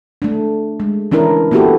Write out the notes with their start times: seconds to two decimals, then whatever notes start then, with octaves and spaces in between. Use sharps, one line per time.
0.22 A3 D4
0.80 G#3
1.12 E3 C#4 D4 E4 A#4
1.51 A#3 B3 E4 F#4 G4 A4